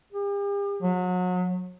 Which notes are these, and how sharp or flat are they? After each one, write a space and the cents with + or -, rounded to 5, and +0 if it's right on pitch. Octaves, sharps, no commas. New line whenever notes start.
G4 +45
F#3 -30